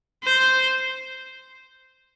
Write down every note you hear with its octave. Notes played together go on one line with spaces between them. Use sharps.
C5